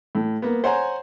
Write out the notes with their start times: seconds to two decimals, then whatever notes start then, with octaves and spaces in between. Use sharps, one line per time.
0.15 A2
0.42 A#3 B3
0.64 C5 C#5 F#5 G#5 A#5